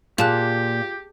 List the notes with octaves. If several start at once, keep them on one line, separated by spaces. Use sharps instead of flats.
A#2 F4 G4 G#4 A5 F#6